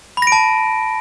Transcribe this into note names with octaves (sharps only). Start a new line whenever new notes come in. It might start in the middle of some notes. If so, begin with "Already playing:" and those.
A5 B5 A#6 D7